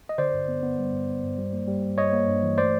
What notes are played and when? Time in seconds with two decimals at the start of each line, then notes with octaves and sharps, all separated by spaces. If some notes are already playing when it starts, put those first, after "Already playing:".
0.09 D#5
0.18 D3 C5 D5
0.34 G2
0.48 B3
0.63 B3
0.79 G3
0.93 G2
1.08 B3
1.24 G2
1.38 G3
1.53 A#3
1.68 G3
1.82 G3
1.98 G2 C#5 D#5
2.13 A#3
2.28 G2
2.43 E3
2.58 A3 C5 D5